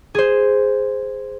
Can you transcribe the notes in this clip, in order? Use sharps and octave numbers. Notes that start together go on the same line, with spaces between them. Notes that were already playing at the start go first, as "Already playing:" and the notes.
G#4 C5